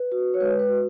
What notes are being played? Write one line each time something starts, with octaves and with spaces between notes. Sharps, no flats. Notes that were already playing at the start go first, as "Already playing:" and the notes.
Already playing: B4
F#4
C#5
G#3 B4
B4
F#4